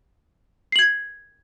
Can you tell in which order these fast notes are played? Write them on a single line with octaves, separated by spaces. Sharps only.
C7 F#7 G#6